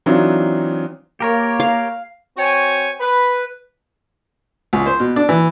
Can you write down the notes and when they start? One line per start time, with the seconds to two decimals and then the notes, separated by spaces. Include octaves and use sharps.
0.06 E3 F#3 C4 D4 D#4 F4
1.20 A#3 G4 A#4 C#5
1.60 F5
2.37 C4 F#4 C#5 G5 G#5
3.00 B4
4.73 C#2
4.86 C5
5.00 B2
5.16 D4
5.29 E3